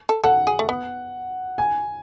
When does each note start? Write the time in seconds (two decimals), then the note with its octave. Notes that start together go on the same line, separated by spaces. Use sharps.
0.09 A4
0.24 A4 F#5
0.47 G#4
0.59 A3
0.69 B3
1.58 G#5